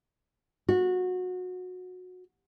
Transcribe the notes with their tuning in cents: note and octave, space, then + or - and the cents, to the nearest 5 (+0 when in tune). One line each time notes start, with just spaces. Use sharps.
F#4 -20